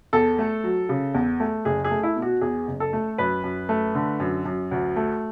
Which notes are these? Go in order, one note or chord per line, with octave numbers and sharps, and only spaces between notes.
E2 A4
A3
F#3
C#3
E2
A3
F#1 G#4
G#4
A3
E4
B2
F#4
E2 G#4
F#1
A4
A3
F#2 B4
F#2
A3
D3
F#2
F#2
D2
A3